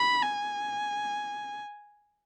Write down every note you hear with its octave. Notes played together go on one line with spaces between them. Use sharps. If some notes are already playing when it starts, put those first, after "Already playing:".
Already playing: B5
G#5